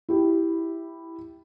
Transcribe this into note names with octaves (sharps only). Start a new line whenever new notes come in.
E4 G4